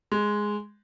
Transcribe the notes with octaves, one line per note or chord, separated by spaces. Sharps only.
G#3